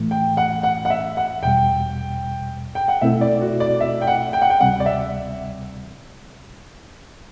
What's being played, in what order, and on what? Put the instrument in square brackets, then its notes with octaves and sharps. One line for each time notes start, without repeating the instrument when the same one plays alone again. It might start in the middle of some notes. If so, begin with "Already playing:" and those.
Already playing: [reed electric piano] A2 E3 A3
[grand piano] G5
F#5
F#5
F#5
E5
F#5
[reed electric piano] E2 B2 G3 [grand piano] G5
[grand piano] G5
F#5
[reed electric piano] B2 A3 C4 E4 A4 [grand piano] E5
[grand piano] D5
F#4
D5
E5
G5
F#5
G5
F#5
G5
[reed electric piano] D2 C3 G3 C4 [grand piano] F#5
[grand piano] D5
E5